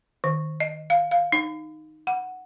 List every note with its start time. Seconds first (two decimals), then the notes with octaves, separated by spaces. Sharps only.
0.24 D#3
0.60 D#5
0.90 F5
1.11 F5
1.32 D#4
2.07 F#5